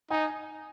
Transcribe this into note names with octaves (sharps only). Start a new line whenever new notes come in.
D#4 G#5